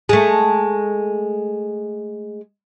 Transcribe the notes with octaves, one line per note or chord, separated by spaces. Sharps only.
G#3 A3